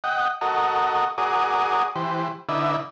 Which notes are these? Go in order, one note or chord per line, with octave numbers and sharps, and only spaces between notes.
D#5 F#5 G5
F#4 A4 A#4 D#5
F#4 G#4 A#4 D5 D#6
E3 G4 C5
D3 D#4 E4 B4 D5 E5